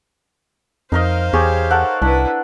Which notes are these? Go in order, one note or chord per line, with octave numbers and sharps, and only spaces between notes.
F2 D#4 A#4 C5 D#5 F5
E2 G4 G#4 C#5
A4 A#4 F#5
C2 D4 E4 B4